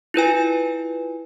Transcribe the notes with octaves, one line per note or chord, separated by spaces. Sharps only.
E4 F4 B4 G#5